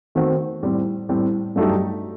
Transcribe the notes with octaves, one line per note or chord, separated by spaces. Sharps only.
D#3 A3 C4 F#4 C5
A2 G3 C4
A2 G3 C4
G2 F#3 A3 D#4 G4